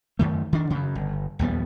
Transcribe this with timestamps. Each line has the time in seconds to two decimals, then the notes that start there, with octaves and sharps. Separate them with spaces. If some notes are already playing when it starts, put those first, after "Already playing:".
0.19 F#2 D#3 A3
0.53 D#3 D4
0.70 F#2 C#3
0.95 G1
1.39 A#1 D#2 G3 B3